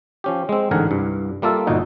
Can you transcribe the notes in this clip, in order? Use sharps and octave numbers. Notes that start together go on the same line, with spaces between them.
F3 C#4 G4
G#3 C4
A1 G#2 D3 A#4 F#5 G#5
C2 G2
G3 A#3 F4 A4 E5
G1 A#2 D#4 F#4